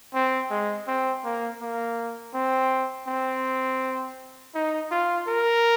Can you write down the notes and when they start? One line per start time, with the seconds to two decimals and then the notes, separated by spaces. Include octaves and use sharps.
0.14 C4
0.50 G#3
0.87 C4
1.24 A#3
1.61 A#3
2.34 C4
3.07 C4
4.55 D#4
4.91 F4
5.28 A#4